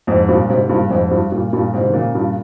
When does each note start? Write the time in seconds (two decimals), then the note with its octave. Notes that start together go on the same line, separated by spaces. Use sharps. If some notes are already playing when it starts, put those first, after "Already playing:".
0.07 F2 G#2
0.29 G2 A#2
0.49 G#2 C3
0.69 G2 A#2
0.90 F2 G#2
1.11 G2
1.32 G2 A#2
1.53 G2 A#2
1.74 G#2 C3
1.89 D#3
1.94 A#2 C#3
2.14 G2 A#2